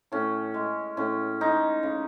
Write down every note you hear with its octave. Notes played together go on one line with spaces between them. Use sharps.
A2 C#4
G#3
A2 C#4
G#3 D#4
C#3